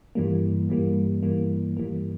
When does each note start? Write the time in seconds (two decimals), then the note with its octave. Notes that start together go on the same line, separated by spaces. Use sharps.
0.15 G2 E3 G3 A#3
0.69 G2 E3 G3 A#3
1.23 G2 E3 G3 A#3
1.77 G2 E3 G3 A#3